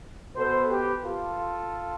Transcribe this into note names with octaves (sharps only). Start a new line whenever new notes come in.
B2 B3 A4 C5
G4 B4
F4 A4